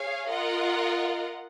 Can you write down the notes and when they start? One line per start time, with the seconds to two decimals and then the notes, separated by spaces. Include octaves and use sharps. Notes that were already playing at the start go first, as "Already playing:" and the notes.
Already playing: G#4 C#5 F5 G#5
0.28 F4 A#4 D#5 F#5